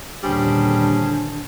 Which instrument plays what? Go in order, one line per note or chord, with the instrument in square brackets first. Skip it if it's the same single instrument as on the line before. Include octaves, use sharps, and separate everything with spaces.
[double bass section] D#2 A#2 D3 [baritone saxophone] G3 [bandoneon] C#4 G#4 C5 [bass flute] D4